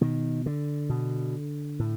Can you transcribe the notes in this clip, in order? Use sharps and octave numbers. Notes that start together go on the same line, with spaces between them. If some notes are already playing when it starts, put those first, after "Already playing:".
B2 D#3
D3
B2
A2